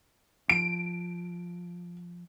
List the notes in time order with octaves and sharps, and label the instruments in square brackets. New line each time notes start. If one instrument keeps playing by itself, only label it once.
[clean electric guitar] F3 [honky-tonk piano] D7